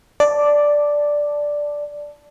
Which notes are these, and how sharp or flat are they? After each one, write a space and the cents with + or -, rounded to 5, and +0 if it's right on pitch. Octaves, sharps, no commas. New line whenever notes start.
D5 +0 A5 +0